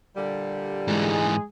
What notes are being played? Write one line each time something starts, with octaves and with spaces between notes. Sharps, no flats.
A#2 D3 G3
G#2 E3 G#3 G#4